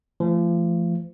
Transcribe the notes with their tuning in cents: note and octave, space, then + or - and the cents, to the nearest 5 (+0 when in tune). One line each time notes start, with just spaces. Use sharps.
F3 -35 A3 +0